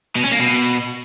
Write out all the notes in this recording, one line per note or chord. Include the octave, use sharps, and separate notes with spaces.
B2
C#4
A#3
B2